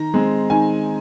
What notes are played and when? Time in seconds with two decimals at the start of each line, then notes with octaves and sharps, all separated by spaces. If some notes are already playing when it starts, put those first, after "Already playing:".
Already playing: D#3 A#5
0.14 G#3 C4
0.50 D#3 G#5